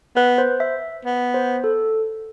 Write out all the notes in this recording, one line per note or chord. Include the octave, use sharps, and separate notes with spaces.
B3 B4
C5
E5
B3
C5
A4